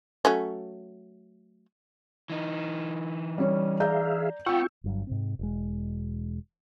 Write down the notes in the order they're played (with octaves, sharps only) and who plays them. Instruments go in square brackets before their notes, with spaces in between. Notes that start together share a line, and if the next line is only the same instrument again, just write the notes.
[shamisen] F#3 A3 C#4
[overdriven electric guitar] E3 D#4
[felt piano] G3 C#4 C#5
[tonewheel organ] G#4 E5 F5 [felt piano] D5 A#5 G6
[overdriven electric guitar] C4 F#5 [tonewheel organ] F4 G5 C#6 [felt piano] E6
[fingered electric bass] G1 G2 F#3
G#2 C3 C4
E1 G#3